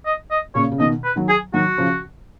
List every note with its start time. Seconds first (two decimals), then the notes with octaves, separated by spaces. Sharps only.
0.06 D#5
0.31 D#5
0.55 A#2 C#3 C#5
0.72 C#3
0.79 B2 D#3 D#5
1.04 B4
1.16 D#3 F#3
1.29 G#4
1.53 D#3 F#3 F#4
1.78 C#3 F3